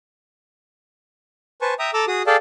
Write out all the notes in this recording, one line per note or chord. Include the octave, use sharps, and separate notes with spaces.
B4 C5 G#5 A5 C#6
E5 G5 A#5 D#6
A4 A#5 D6 E6
F#4 G#4 D#6
G#4 A4 D5 F5 G5 A5